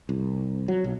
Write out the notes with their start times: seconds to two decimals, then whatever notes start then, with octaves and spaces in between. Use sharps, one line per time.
0.09 C2
0.68 F#3
0.84 B1